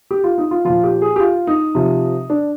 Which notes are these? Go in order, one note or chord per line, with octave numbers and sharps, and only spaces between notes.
G4
F4
D#4
F4
A#2 F3 F4
G4
G#4
G4
F4
D#4
C3 F3
D4